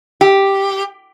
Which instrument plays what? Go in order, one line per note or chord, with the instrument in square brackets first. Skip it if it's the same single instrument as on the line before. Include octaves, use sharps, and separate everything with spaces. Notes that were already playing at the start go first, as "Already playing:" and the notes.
[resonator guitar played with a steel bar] G4